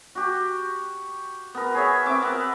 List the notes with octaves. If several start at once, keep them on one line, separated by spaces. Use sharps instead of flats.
F#4 G4
B3 A#4
G#4 C#5 E5
C4 E5 D6
B3 A#4 F#5